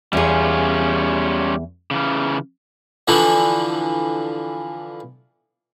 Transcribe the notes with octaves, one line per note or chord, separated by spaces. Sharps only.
E2 G3 C#4 F4 G#4
C#3 E3
D3 E3 F3